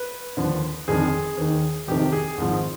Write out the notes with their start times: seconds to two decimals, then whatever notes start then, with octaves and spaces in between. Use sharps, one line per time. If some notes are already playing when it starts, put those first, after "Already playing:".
Already playing: B4
0.37 D#2 D3 F3
0.88 G1 F2 D#3 G#4
1.37 D#2 D#3
1.87 F1 F2 C3 D#3 G4
2.12 G#4
2.38 G#1 G#2 F3